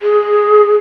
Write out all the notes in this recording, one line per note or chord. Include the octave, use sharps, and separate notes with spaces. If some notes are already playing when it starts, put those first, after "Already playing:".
G#4